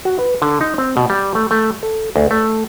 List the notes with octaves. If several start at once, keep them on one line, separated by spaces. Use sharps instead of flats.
F#4
B4
D3
D#4
C4
B2
G3
A3
A3
A4
D2
A3